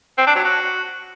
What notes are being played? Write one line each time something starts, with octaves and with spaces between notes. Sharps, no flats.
C4
D4
F#3
F#4